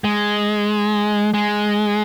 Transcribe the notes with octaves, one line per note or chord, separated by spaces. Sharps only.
G#3
G#3